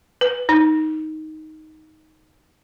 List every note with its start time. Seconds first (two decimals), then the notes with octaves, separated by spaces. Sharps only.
0.21 B4
0.49 D#4